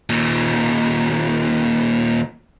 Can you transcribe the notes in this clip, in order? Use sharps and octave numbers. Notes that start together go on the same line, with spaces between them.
D#2 A#2